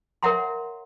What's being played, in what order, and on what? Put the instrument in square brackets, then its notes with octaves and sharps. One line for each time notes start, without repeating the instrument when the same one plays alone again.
[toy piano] A#4 C#5 E5 F#5 A#5 C6